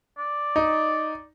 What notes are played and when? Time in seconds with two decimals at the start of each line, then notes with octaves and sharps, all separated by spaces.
0.18 D5
0.56 D#4